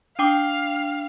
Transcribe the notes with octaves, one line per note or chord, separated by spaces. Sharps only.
D4 F5 G5 D6